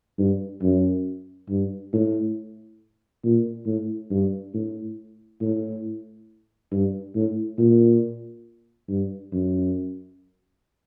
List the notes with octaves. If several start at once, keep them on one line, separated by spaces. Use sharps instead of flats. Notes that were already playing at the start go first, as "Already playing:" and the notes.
G2
F#2
G2
A2
A#2
A2
G2
A2
A2
G2
A2
A#2
G2
F#2